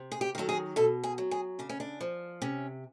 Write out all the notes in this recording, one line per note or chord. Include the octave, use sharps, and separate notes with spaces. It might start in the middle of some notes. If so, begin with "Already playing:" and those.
Already playing: C3
G#4
G4
D#3 F#3 A4
G#4
B2 A4
G#4
F#3
G#4
C#3 D4
C#4
D4
F3
C3 C#4